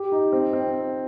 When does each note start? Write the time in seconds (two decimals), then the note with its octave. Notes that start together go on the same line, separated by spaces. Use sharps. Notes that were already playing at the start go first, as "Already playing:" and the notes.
Already playing: G4
0.12 D#4
0.32 C4
0.53 C4